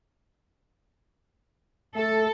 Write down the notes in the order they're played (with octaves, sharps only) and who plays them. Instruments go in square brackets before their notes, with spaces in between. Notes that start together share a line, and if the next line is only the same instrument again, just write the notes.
[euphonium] A3 [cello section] A4